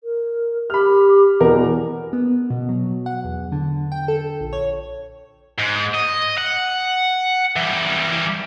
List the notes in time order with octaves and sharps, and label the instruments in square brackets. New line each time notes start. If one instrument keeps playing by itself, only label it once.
[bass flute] A#4
[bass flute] G4 [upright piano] B5 F6
[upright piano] E2 B2 A#4 [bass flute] B3
[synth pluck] B3
B2
F#3
F#5
E2
D3
G5
A4
A#1
C#5
[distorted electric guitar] G#2
D#5
F#5
E3 G3